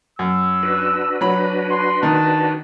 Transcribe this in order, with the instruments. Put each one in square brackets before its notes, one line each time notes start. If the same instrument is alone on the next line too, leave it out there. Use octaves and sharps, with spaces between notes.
[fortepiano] F#2 [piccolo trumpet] E6
[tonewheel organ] D4 F#4 B4
[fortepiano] F#3 B5
[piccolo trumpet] C6
[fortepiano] D#3 [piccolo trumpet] A5